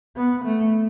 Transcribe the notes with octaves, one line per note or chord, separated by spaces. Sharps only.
B3
A3